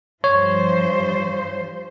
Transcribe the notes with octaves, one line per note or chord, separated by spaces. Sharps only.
G2 F3 C5 C#5